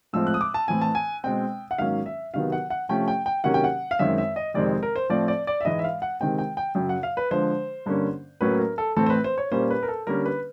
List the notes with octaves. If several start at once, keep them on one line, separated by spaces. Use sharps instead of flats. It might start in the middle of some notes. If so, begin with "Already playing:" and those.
A2 F3 G#3 C4 E6
F#6
D#6
D6
A5
A2 E3 A3 C4 G#5
A5
G#5
B2 G#3 C4 G5
F#5
G#2 D#3 F#3 A#3 C#4 F5
E5
C3 D#3 F#3 B3 F5
F#5
F#5
C3 F3 A3 C#4 G5
G5
G5
C3 D#3 F#3 A#3 C#4 F#5
G5
F#5
F5
F#2 D#3 G#3 C4 E5
E5
D#5
F2 C3 D#3 G#3 C4 D5
A#4
C5
A2 F3 A3 C4 D5
D5
D5
E5
G#2 E3 G#3 D#5
E5
F5
F#5
C3 D#3 G#3 C4 G5
G5
G5
F#2 C#3 F#3 G5
F#5
F5
B4
D3 F3 G#3 C5
G2 D3 G3 A#3 C#4
A2 F#3 A#3 C#4 B4
A#4
A4
A2 E3 A3 C4 A4
C5
B4
C5
C#5
A#2 G3 A#3 C#4 C5
B4
A#4
A4
D3 G3 A#3 C#4 A#4
B4